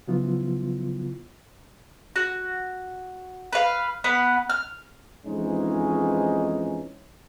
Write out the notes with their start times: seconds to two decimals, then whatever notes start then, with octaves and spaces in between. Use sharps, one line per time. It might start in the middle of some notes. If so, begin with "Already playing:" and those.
0.07 C#3 F3 F#3 B3 E4 F4
2.16 F#4
3.53 B4 F5
4.04 B3 B4 F#5
4.50 F6
5.26 F2 G#2 E3 G#3 C#4 D#4